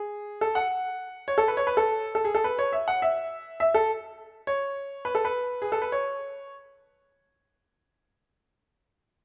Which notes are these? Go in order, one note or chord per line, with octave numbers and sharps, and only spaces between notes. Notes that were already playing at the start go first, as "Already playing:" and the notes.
Already playing: G#4
A4
F#5
C#5
A4
B4
C#5
B4
A4
A4
G#4
A4
B4
C#5
E5
F#5
E5
E5
A4
C#5
B4
A4
B4
G#4
A4
B4
C#5